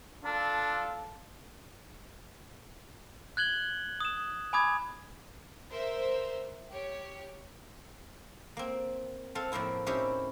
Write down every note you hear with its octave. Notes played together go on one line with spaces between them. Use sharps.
D4 F4 A4
F#6 G#6 F#7 G7
D#6 E7
G#5 B5 D6 D#6 G#6
A#4 C5 E5
G4 C#5
A#3 C4
C4 A4 F5
A2 F3 A#3 C4 E4
C4 C#4 D#4 E4 G4 C5